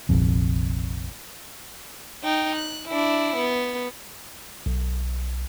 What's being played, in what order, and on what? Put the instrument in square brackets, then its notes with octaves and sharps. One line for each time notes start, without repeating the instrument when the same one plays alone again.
[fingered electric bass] F1 A#1 F2
[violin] D#4 G5
F#6
D4 E4
B3
[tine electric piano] B1